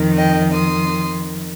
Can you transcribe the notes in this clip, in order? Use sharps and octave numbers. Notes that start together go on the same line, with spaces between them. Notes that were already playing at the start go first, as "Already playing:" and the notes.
Already playing: F2 D#3
D#5 G5
C6 D#6